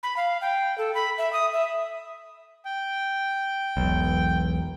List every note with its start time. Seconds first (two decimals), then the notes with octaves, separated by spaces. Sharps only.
0.03 B5
0.17 F5
0.41 G5
0.78 A4
0.95 B5
1.18 E5
1.33 D#6
1.53 E5
2.65 G5
3.77 E1 B1